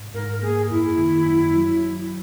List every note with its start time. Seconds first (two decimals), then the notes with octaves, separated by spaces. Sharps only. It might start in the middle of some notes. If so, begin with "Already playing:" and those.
Already playing: G#2
0.14 G#2 A#4
0.42 A#3 G#4
0.70 F#2 E4
0.98 D#3
1.26 F#2
1.54 F#3